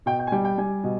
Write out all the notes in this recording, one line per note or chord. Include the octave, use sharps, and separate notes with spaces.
B2 G5
G5
G#5
G3 G5
G5
G3 G#5
B2